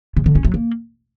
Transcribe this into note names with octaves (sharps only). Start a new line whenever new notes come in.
C#3
D3
C#4
F#3
A#3